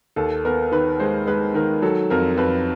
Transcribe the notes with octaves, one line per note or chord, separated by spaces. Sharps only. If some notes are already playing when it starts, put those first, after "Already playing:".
D#2 A4
B3 A#4
D#3 B4
G#3 C5
G#3 B4
D#3 A#4
F#3 A4
F2 A#4
F2 B4